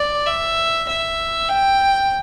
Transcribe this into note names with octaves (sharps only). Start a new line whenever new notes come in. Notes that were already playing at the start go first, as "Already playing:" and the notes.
Already playing: D5
E5
E5
G5